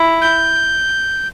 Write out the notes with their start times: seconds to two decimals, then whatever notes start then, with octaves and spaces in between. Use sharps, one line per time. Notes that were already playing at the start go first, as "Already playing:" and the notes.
Already playing: E4
0.21 G6